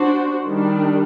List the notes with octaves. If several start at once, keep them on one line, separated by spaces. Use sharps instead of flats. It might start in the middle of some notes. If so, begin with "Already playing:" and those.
Already playing: D4 F#4 C5
D#3 G3 D4